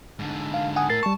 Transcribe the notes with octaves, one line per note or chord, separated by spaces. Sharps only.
G#2 D3
F5
F#5 G#5 D#6
A2 A#4 A6 C7
G3 A5 C#6